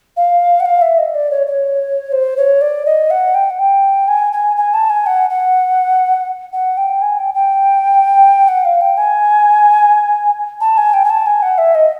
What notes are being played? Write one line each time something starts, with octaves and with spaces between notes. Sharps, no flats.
F5
F#5
F5
E5
D#5
D5
C#5
C#5
C5
C#5
D5
D#5
F#5
G5
F#5
G5
G#5
G#5
G#5
A5
G#5
F#5
F#5
F#5
G5
G#5
G5
G5
F#5
F5
G5
G#5
A5
G#5
G5
G#5
A5
G#5
F#5
E5
D#5